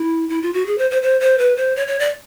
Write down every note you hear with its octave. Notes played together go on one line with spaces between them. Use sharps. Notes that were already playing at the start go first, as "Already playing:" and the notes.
Already playing: E4
E4
F4
F#4
G#4
C5
C5
C5
C5
B4
C5
C#5
C#5
D5